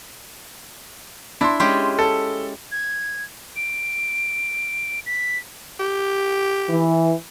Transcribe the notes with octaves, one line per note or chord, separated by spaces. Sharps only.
D4 E4 C6
G#3 C#4 G4
A4
G#6
D7
B6
G4
E3